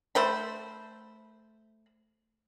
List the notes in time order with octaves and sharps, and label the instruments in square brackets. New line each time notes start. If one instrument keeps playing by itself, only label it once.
[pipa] A3 C5 B5